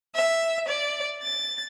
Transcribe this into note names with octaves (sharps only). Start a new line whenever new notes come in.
E5
D5
A6